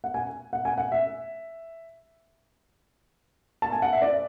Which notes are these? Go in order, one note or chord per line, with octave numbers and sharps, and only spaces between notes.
F#5
G#5
F#5
G#5
F#5
E5
A5
G#5
F#5
E5
D5